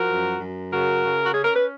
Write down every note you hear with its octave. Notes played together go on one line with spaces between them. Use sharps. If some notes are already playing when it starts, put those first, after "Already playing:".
Already playing: F3 F#4 A#4
F#2
F#2
C#3 F#4 A#4
C#3
F#4
C#4 G#4
A#4
B4